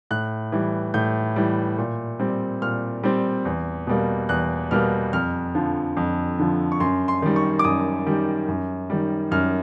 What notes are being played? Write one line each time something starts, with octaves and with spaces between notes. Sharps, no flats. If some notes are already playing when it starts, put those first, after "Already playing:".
A2 F#6
E3 G3
A2 G6
E3 G3
A#2
G3 C4
A#2 F6
G3 C4
E2
B2 G3 A#3
E2 F#6
B2 G3 A#3 F6
F2 F6
D3 F3
F2
D3 F3
C#6
F#2 C6
C6
D#3 G3
C#6
D6
F#2 D#6
D#3 G3
F#2
D#3 G3
F#2 F6